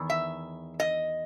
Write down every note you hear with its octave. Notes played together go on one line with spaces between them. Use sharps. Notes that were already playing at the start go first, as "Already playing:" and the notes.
Already playing: E2 D#3
E5
D#5